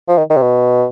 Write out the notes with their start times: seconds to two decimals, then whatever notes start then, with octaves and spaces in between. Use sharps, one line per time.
0.09 F3
0.18 D#3
0.30 D#3
0.37 C3
0.42 B2